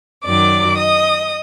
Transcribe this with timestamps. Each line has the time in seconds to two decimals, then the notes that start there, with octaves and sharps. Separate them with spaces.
0.24 F#2 D#3 F#3 D5 D6
0.77 D#5 D#6